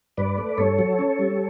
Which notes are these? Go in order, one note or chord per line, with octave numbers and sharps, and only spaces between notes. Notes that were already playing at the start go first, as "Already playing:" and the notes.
G2 B4 D5
A3
G2 A4 C#5
F#3
C#4
G3